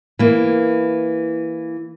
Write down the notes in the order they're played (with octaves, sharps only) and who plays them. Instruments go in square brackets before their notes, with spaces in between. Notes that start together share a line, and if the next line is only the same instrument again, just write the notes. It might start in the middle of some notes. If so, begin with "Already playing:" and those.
[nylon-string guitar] E3 A#3